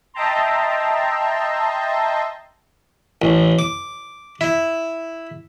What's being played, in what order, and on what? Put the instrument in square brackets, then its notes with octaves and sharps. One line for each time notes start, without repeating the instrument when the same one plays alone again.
[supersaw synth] D#5 E5 G5 A5 A#5 C6
[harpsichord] A1
D6
E4